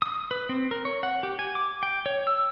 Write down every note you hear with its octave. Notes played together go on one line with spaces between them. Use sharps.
D#6
B4
C4
A#4
C#5
F#5
G4
G#5
D6
G5
C#5
E6